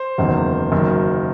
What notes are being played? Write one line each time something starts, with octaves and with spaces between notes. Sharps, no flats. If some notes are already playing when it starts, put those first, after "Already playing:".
Already playing: C5
F#1 E2 D#3
F#1 F#2 D#3